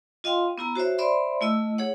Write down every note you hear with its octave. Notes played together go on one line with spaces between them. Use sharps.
F4 D#5 F5 G5 C6
B3 E4 A#5
F#4 C5 C#5 E5
C5 D5 E5 B5 C6
A3 E4 D#5 E6
G#4 C#5 F#5